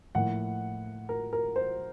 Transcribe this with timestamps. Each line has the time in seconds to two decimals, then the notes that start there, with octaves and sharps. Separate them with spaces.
0.15 A2 F3 A#3 F#5
1.09 A#4
1.33 A#4
1.56 C5